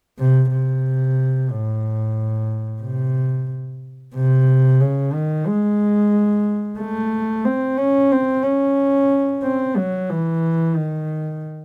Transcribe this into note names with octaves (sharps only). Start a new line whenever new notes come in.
C3
C3
A2
C3
C3
C#3
D#3
G#3
A3
C4
C#4
C4
C#4
C4
F#3
E3
D#3